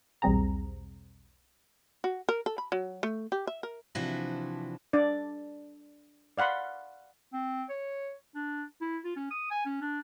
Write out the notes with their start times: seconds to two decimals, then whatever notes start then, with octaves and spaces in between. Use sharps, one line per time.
0.22 B1 E2 G3 C4 G#4 A#5
2.04 F#4
2.29 A#4
2.46 A4
2.58 B5
2.72 F#3
3.03 A3
3.32 G4
3.47 E5
3.63 A#4
3.95 C3 E3 F3 D4 E4 F#4
4.93 D4 D5
6.38 D5 F5 F#5 B5 C6
7.33 C4
7.69 C#5
8.35 D4
8.81 E4
9.04 F4
9.16 C#4
9.31 D#6
9.51 G#5
9.66 C#4
9.82 D4